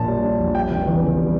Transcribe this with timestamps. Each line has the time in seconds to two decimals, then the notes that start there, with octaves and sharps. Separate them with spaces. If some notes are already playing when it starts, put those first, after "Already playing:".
Already playing: A#1 A#2 D4 C#5 A5
0.08 G3
0.24 D4
0.39 A#1
0.55 G3 G5
0.71 F1
0.86 E2
1.02 C#3
1.18 G3